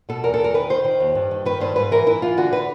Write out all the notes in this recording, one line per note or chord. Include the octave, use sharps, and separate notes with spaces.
B2 A4
E2 A#4
A4
E2
A#4
D#3 B4
D#3 C5
D#3
D#2
G2
D#3
D#3 B4
G2 C5
G#2 B4
E3 A#4
E3 E4
E3 F4
D3 F#4
D3 B4